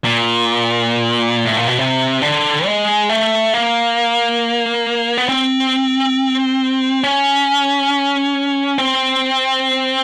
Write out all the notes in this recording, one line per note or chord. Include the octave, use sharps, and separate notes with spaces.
A#2
A2
A#2
B2
C3
D3
G#3
A3
A#3
B3
C4
C#4
C4